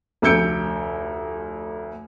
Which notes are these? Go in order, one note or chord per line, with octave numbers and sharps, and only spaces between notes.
F1 D2 E6 G6 C#7 D7